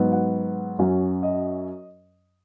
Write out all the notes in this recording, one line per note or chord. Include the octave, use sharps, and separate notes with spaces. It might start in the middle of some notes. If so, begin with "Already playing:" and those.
Already playing: G#2 F#3 B3
F#5
F#2 F#3 C#4
D#5